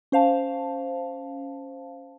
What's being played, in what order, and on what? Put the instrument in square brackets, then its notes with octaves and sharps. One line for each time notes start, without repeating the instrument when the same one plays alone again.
[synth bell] C#4 C5 F5 A5